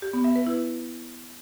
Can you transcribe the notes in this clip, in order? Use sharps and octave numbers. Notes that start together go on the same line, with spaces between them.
G4
B3
E5
B4
E4